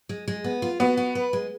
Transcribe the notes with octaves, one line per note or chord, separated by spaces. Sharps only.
G#3
G#3
B3
F4
B3 F#4
F#4
B4
G#3